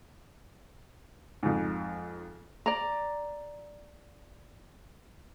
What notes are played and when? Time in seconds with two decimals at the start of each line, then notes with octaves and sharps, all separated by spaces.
1.43 F2 G#2
2.66 D5 A#5